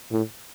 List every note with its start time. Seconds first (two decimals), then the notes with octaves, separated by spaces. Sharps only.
0.12 A2